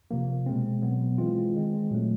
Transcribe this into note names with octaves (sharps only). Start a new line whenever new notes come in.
C3 F3 A#3
B2 G#3 C4
B2 F#3 B3
E3 G#3 C4 F4
D#3 G#3 C4
A#2 F#3 A3